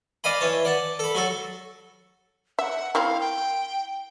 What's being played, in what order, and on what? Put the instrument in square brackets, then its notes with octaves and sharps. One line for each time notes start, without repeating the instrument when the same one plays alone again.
[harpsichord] D5 D#5 F5 G#5 B5
E3 C#5 A5
D5 F#5 A5
A4 B5
F#3 F#4 A4
[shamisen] E5 [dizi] F#5
[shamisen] C4 E4 A#4 [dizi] F5
[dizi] G5